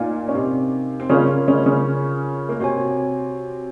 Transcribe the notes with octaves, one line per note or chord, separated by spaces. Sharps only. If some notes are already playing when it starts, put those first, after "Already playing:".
Already playing: A#2 A#3 D#4 A#4 F5 G#5
C#4
C3 C4
C4
C#3 C#4 F4 A#4 C#5 F5
C#3 C#4
C#3 C#4
A#3
C3 C4 F#4 C#5 G#5